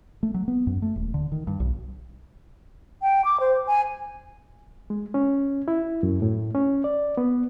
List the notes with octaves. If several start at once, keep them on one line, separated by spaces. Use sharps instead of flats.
A3
F#3
B3
F#2
A3
D#1
D3
D#3
G2
B1
G5
D6
C5
G#5
G#3
C#4
E4
F#2
A2
C#4
D5
B3